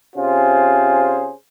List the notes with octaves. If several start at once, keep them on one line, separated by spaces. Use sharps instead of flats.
C3 C#4 F4 G#4 C5